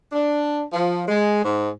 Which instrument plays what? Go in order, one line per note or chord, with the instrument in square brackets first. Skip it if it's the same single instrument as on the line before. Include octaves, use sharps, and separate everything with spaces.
[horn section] D4
F3
G#3
G#2